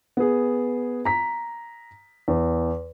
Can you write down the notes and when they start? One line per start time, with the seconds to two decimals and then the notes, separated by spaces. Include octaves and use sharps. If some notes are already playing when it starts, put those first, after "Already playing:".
0.17 B3 G#4
1.05 A#5 B6
2.28 E2